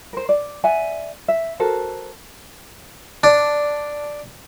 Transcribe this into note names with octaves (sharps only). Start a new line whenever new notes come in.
A#4 C5
D5
D5 E5 F#5 G#5
E5
F#4 A4 A#4 C5
D4